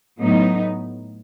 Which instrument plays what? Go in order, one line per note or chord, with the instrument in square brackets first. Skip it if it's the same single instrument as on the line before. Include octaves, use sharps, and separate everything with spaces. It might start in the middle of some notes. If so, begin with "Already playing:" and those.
[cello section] A2 F#3 B3 D#4